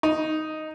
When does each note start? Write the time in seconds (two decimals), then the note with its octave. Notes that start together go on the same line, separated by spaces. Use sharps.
0.03 D#4